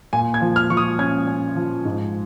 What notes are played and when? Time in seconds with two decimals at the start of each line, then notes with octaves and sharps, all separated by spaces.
0.13 A#2 G#5
0.34 G#6
0.41 F3
0.56 F6
0.70 F3 C#6
0.77 D#6
0.99 C#4 G#6
1.28 C#4
1.56 F3
1.85 G#2